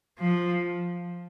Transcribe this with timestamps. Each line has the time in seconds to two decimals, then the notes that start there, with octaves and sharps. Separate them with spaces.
0.19 F3